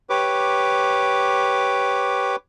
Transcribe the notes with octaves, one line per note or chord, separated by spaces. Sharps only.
G4 B4 C#5 D6